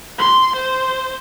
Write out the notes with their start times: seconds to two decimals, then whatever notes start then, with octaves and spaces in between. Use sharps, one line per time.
0.18 C6
0.56 C5